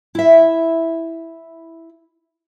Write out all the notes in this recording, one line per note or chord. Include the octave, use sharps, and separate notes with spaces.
E4 E5